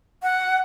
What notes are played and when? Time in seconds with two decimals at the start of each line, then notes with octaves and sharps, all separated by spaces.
0.23 F#5